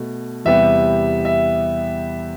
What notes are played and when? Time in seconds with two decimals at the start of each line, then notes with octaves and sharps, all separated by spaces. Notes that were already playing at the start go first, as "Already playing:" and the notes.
Already playing: B2 A3
0.45 E2 C3 G3 B3 E5
1.25 E5